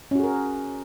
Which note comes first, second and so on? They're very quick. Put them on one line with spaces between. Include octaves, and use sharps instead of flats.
C#4 F#4 G#4 A#4